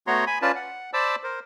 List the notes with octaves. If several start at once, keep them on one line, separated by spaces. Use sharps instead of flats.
A3 B3 F#4 C#5 A#5 C6
G#5 B5
C#4 F4 B4 D5 A5
F#5
C5 D5 A5 B5 D6 E6
A#4 C5